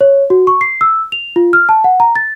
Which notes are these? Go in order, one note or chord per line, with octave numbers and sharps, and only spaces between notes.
C#5
F#4
C#6
C7
E6
F7
F4
F6
A5
F#5
A#5
A6